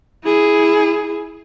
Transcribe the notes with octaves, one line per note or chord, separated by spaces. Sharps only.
E4 G#4